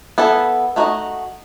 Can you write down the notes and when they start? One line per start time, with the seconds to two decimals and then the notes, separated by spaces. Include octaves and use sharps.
0.18 B3 E4 A4
0.76 A3 D#4 F#4 B4 D#5